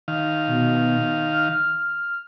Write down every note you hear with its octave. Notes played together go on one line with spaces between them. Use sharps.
D#3 F5
B2
F6